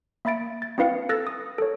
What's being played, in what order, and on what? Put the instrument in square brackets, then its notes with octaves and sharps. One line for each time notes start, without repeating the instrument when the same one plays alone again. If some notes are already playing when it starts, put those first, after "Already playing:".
[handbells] A#3 E5 B5 A6 D7
A6
C4 D4 E4 B4 F5 C#7
A4 E6 F#6 A6 A#6
D#6
A4 C#5